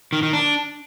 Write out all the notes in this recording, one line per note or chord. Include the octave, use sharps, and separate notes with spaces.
D#3
D#3
D4